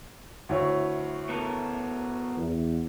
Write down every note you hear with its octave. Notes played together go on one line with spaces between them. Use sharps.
D2 E4 C#5
B3 A4 A#4
E2